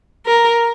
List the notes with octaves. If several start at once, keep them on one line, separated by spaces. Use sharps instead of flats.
A#4